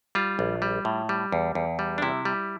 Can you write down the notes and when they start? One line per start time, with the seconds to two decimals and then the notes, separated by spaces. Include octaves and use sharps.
0.15 G3 F4
0.39 A#1
0.62 G3
0.85 A2
1.09 G3
1.32 E2
1.55 E2
1.79 G3
1.98 D4
2.02 C3 E4
2.25 G3